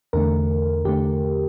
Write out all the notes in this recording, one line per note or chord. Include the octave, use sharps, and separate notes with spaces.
E2 D3 A3 A#4
E2 D3 A3 G4